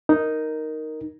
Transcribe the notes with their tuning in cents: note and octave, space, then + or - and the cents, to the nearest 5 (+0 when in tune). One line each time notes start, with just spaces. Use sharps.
D#4 +0 A#4 +0